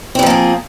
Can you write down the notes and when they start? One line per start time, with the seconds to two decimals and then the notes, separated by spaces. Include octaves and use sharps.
0.15 C4
0.19 G3
0.23 F3
0.26 A#3
0.30 G#4